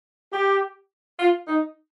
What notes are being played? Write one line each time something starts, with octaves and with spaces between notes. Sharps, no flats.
G4
F4
D#4